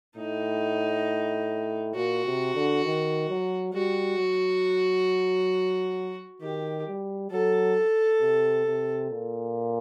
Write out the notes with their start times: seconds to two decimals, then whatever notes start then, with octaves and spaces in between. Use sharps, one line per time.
0.17 A2 D#4
1.95 A#2 F#4
2.25 C3
2.54 D3
2.85 D#3
3.29 F#3
3.74 G3 F#4
4.18 F#3
6.41 D#3 G4
6.87 G3
7.31 F#3 A4
8.21 C3
8.65 C3
9.11 A#2